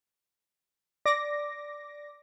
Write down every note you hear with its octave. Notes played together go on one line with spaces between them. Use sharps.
D5 D6 A#6